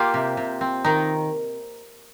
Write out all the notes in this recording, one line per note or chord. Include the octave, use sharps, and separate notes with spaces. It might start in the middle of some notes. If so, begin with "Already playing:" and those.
Already playing: A#3 F4 G4
C3
C3
C4
D#3 D#4